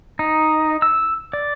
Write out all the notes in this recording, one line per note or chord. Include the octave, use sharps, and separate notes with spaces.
D#4
E6
D5